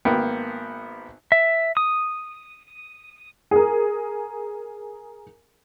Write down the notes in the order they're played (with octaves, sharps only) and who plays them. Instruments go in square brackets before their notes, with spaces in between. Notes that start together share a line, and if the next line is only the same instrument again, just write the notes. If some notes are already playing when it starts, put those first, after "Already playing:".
[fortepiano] G#1 A#3 B3 G5
[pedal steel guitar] E5
D#6
[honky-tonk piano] G#4 A#4